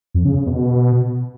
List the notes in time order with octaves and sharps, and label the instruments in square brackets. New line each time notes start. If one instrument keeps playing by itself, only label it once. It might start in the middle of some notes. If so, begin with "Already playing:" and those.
[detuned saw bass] F2
C#3
C#3
B2